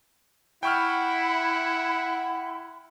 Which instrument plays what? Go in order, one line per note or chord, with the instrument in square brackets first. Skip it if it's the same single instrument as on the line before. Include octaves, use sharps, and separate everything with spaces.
[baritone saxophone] E4 [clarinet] F#5 [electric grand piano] G5 C#6 F6 [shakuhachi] B5